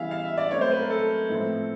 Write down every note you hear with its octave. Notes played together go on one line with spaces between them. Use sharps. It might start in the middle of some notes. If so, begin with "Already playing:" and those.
Already playing: C#3 E3 G3 B3 E5 F5
F5
E5
D5
B2 F#3 A3 C4 C#5
C5
B4
A#4
A4
A2 F3 A3 C4